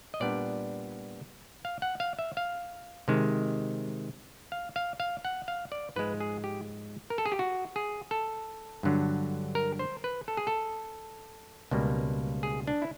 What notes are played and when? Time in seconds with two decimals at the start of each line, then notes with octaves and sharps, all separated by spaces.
0.14 D#5
0.20 A#2 G3 B3 D4 D5
1.65 F5
1.82 F#5
2.00 F5
2.19 E5
2.37 F5
3.08 C3 D#3 G#3
4.52 F5
4.76 F5
5.00 F5
5.25 F#5
5.48 F5
5.72 D5
5.96 G#2 F3 G#3 B4
6.20 G#4
6.44 G4
7.10 A#4
7.18 A4
7.26 G#4
7.32 G4
7.39 F#4
7.76 G#4
8.11 A4
8.83 G2 D3 F#3
9.55 A#4
9.79 C5
10.04 B4
10.28 A4
10.37 G#4
10.47 A4
11.71 C#2 B2 G3 A#3
12.43 G#4
12.67 D4
12.82 E4